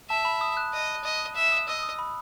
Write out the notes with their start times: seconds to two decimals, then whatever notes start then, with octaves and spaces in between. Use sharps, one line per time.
0.10 E5 A5
0.25 B5
0.41 D#6
0.57 F#6
0.73 D#5
1.04 D#5
1.35 E5
1.52 D#6
1.68 D#5 E6
1.83 D#6
1.99 B5